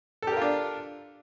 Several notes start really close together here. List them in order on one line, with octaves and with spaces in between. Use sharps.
A4 G4 A#4 F4 D4